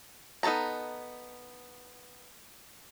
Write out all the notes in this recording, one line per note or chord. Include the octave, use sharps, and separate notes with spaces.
B3 D#4 A4 A5 A#5